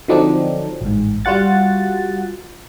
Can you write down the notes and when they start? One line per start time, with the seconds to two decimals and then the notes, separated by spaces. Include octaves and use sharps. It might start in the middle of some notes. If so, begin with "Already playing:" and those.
0.08 D3 F3 F#3 C4 D4 D#4
0.81 A1 G#2
1.25 G3 F4 F#4 F#5 A6